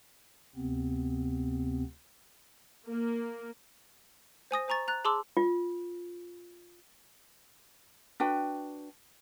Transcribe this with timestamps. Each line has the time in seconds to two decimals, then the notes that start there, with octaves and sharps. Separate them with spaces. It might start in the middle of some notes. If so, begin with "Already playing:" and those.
0.55 D2 C3 B3 C4
2.88 A#3
4.51 C5 G#5 D#6 A#6
4.68 C5 G#5 A#5 C#6 A6
4.88 A#5 F#6 A6
5.05 G#4 A5 C6 D6 E6
5.37 F4
8.20 D4 F#4 B4 G5